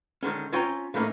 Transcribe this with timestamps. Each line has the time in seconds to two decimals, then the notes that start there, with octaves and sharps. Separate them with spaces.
0.23 D3 D#3 G#3 C#4
0.53 C4 C#4 F4 G5 G#5 A#5
0.94 A2 E3 A3 A#3 C#4 D#4